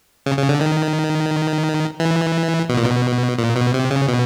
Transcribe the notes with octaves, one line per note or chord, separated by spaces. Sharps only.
C#3
C#3
D3
D#3
E3
B2
A#2
B2
A#2
B2
C3
C#3
B2